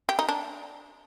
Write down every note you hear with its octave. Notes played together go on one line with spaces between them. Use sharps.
G4
D#4
D4